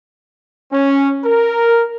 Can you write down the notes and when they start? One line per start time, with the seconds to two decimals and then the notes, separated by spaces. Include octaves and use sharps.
0.72 C#4
1.24 A#4